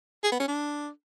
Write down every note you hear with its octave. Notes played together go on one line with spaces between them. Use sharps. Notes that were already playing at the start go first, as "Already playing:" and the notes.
G#4
B3
C#4
D4